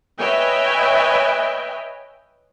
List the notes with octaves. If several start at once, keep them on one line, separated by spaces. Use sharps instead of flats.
B4 C#5 D#5 E5 G5 G#5